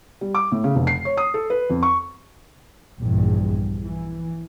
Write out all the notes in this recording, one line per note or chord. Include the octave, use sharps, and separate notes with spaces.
G3
D6
A2
C#3
F1
C7
C#5
D#6
A4
B4
F2
C#6
A#1 E2 G2
E3